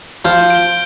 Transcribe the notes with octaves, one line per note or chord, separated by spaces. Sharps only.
F3 F4 G6
D7 G7